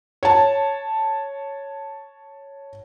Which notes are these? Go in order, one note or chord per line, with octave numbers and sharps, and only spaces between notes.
C#5 A5